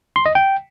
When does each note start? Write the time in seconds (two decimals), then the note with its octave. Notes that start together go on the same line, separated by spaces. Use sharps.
0.16 C6
0.26 D#5
0.35 G5